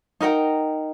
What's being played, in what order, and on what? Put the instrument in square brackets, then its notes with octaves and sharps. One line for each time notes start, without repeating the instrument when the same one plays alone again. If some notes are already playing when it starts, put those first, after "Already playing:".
[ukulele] D#4 A#4 F#5 G5